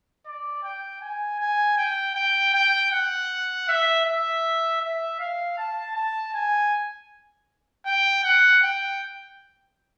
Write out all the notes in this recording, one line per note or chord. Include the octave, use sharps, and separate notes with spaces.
D5
G5
G#5
G#5
G5
G5
G5
F#5
E5
E5
E5
F5
A5
A5
G#5
G5
F#5
G5